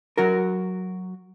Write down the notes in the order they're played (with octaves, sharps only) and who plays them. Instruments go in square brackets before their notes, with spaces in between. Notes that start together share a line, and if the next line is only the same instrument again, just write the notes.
[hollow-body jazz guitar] F#3 F#4 A#4